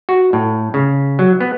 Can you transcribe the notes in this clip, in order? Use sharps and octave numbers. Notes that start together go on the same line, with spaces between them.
F#4
A2
C#3
F#3
B3